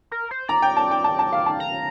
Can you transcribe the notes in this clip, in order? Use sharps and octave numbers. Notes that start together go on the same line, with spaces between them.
A#4
C5
D5 A#5
G5
A5
G5
A5
A5
F5
A5
A#5